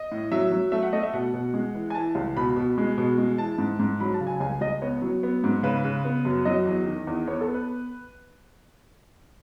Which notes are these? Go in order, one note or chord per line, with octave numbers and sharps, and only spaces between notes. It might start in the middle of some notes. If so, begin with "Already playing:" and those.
Already playing: D#5
A2
F#3 E5
F#3
A3 E5
F#5
A3 D#5
E5
B2 F#5
B2
G#3
E3
G#5
E3 A5
C#2
B2 B5
B2
G#3
B2
G#3
E3 A5
G#2
G#2
F#3 B5
A5
C#3
G#5
C#2 G#5
C#2 D#5
B3 C#5
F#3
B3
G#2
C#3 B4
C#3
B3
F#2
F#3 D#5
E2
D#3
E2
B3 C#5
A4
B3
B4